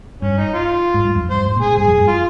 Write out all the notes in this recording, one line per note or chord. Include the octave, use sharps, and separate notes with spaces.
G2 C#4
D#4
F4
G#2
G2
F2
G2 C5
G#2
A#2
G#4
A#2
G2 G#4
F2
G2
F4